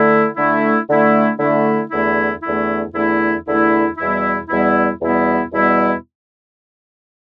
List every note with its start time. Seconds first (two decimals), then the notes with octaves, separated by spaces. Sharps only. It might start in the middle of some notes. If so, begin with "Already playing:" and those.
Already playing: D3 A3 E4
0.36 D3 A3 E4
0.88 D3 A3 E4
1.39 D3 A3 E4
1.91 E2 D3 A3 E4
2.43 E2 D3 A3 E4
2.94 E2 D3 A3 E4
3.45 E2 D3 A3 E4
3.97 E2 B2 G3 B3 E4
4.48 E2 B2 G3 B3 E4
5.00 E2 B2 G3 B3 E4
5.52 E2 B2 G3 B3 E4